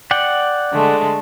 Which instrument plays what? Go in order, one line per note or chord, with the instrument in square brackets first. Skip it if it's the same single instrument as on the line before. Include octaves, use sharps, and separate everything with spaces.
[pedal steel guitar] D5 F#5 G5
[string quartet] D3 G#3 A3